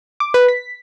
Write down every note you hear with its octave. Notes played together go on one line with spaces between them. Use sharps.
D6
B4
B6